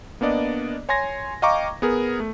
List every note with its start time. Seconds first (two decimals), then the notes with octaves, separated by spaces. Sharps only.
0.21 A#3 B3 D4 D5 D#5
0.89 C#5 G#5 C6 G#6 A#6
1.42 D#5 F5 G5 A#5 C#6 D6
1.82 B3 G#4 A#4
2.20 A3